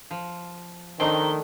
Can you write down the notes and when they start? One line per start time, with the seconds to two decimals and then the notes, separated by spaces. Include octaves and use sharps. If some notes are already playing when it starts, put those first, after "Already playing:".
0.11 F3
1.00 D#3 A3 C4 D4 D#4 G7